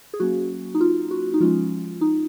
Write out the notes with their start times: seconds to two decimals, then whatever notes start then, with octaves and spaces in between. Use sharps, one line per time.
0.14 G#4
0.20 F#3 A#3 C#4 F#4
0.75 D#4
0.81 F4
1.11 F#4
1.34 D#4
1.40 F3 G#3 C#4 F4
2.01 D#4